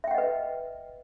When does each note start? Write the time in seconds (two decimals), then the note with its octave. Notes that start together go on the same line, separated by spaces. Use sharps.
0.04 E5
0.07 G5
0.11 F#5
0.15 D#5
0.18 B4